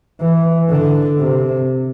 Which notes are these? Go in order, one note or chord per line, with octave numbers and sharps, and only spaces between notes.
E3
D3
C3